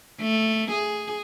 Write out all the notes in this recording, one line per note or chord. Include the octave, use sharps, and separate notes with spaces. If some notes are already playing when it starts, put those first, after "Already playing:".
A3
G#4